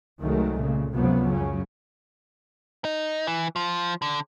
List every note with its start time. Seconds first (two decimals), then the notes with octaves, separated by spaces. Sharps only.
0.22 C2 D#3 F#3 G#3 A3
0.61 A#2 C#3
0.94 C#2 F#2 C3 F3 F#3 B3
1.31 F#2 C#3 C#4
2.85 D#4
3.27 E3
3.56 F3
4.02 D3